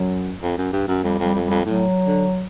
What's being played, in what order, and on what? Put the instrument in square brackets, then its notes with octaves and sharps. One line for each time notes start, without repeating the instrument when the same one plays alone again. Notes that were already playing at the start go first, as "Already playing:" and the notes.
Already playing: [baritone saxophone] F#2 [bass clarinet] F#3
[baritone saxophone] F2
F#2
G2
F#2
[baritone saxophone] F2 [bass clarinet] G3
[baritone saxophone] F2 [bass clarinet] G3
[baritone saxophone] F2
[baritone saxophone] F2 [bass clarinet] G3
[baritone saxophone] A2 [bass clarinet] F#3
[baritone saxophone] D3